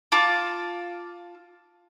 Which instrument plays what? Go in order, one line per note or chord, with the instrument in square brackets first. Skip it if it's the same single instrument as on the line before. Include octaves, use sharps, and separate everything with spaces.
[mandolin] F4 A5 D6